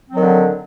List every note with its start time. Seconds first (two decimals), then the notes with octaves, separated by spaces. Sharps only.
0.10 C4
0.14 F#3
0.17 D#3
0.21 D3